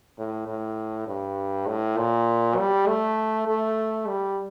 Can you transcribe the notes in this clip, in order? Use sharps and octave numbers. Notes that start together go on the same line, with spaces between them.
A2
A2
G2
A2
A#2
G3
A3
A3
G3